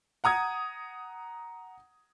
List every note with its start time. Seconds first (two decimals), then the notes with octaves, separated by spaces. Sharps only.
0.24 F#5 A#5 D#6 G#6